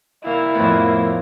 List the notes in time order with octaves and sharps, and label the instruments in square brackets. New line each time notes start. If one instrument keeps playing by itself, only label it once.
[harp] C2 [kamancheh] A#3 [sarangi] E4
[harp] F2 A2 B3 [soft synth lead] A3